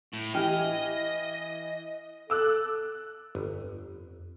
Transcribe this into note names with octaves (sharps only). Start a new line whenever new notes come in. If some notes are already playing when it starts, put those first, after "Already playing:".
A2
E3 G4 D#5 F6
A4 D6 E6 F#6
G1 F2